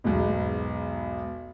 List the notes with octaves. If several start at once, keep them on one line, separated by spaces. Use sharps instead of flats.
B1 E2 G#2 B2